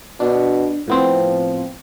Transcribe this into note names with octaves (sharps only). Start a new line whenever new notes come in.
B2 D4
A2 F3 B3 C4